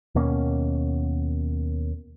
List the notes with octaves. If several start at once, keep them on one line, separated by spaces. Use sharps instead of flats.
D#2 B2 A#3 C#4